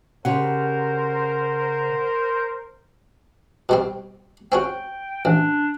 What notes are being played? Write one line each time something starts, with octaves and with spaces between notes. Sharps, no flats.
C#3 G4 A#4 C5 F#5
B2 G3 C4
C4 C#4 F#4 G5
A1 D4